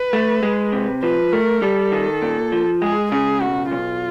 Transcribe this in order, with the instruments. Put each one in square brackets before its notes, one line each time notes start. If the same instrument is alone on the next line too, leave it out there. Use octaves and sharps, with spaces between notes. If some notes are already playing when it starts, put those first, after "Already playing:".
Already playing: [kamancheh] B4
[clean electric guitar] A3
G#3
C3
[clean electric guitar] F3 [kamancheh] B4
[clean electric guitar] A3 [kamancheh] A#4
[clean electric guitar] G3 [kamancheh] A4
[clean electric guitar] D#3
A#2
F3
[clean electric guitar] G#3 [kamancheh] G#4
[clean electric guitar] C#3 [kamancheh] G#4
[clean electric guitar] B1 [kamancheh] F#4
[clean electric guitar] B1 [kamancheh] F4